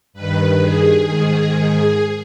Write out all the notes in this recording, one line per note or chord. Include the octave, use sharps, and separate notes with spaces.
G2 D#3 B4
G#4
G#2 D#3